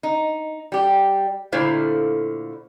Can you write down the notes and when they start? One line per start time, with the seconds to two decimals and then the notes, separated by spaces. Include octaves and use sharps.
0.03 D#4
0.72 G3 G4
1.52 A#2 D3 A3 E4 C5 F5